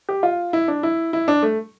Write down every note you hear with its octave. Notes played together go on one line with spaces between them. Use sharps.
G4
F4
E4
D4
E4
E4
D4
A3